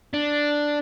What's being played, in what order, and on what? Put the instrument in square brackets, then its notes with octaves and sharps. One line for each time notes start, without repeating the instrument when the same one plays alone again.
[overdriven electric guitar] D4